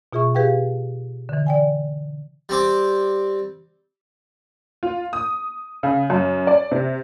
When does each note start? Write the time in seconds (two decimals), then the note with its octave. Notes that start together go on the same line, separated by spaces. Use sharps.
0.13 B2 F4 G#4 E5 C#6
0.35 G4 G#4 B4 F5 G5
1.29 D3 E3
1.46 D5 G5 G#5
2.49 G3 C4 D6
4.83 F4
5.13 D#6
5.83 C#3
6.10 F#2
6.47 D5
6.72 C3